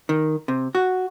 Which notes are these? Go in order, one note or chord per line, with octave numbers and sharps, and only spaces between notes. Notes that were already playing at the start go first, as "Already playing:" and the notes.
D#3
C3
F#4